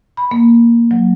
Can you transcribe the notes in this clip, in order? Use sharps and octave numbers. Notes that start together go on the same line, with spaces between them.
B5
A#3
F#3